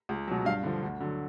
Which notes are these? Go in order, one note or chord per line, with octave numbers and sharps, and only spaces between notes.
C#2
B2 F#3
G2 F5
D3 F3
D2
D3 F#3